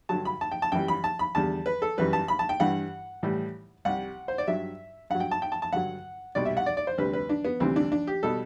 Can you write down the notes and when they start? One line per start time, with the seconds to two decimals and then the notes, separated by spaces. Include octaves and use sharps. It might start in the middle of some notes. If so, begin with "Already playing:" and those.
0.09 G2 D3 F#3 A5
0.25 B5
0.41 A5
0.51 G5
0.62 A5
0.72 F#2 E3 G3 G5
0.88 B5
1.04 A5
1.19 B5
1.35 E2 D3 G3 A5
1.66 B4
1.82 A4
1.97 F#2 E3 G3 B4
2.13 A5
2.28 B5
2.39 A5
2.49 G5
2.60 G2 E3 G3 F#5
3.23 A2 E3 G3
3.85 C2 C3 G3 F#5
4.28 C5
4.38 D5
4.47 G2 F#3 E5
5.10 G2 F#3 F#5
5.20 G5
5.31 A5
5.42 G5
5.52 A5
5.62 A5
5.72 G2 D3 F#3 F#5
6.35 C2 B2 G3 D5
6.45 E5
6.57 F#5
6.66 D5
6.77 D5
6.87 C5
6.98 D2 C3 G3 B4
7.13 B4
7.29 D4
7.45 B3
7.60 D2 C3 E3 G3 C4
7.76 D4
7.92 D4
8.07 G4
8.23 B2 G3 A4